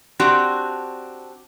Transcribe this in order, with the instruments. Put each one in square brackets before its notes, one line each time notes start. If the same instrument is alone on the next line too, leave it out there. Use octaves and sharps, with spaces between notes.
[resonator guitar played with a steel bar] C4 D4 F#4 G4